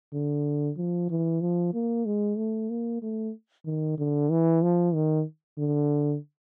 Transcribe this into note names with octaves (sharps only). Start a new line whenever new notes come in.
D3
F3
E3
F3
A#3
G#3
A3
A#3
A3
D#3
D3
E3
F3
D#3
D3